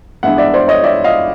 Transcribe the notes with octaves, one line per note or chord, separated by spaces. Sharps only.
G2 E3 G#3 B3 D4 E5 F#5
D5 E5
C5 D5
C#5 D#5
D5 E5
D#5 F5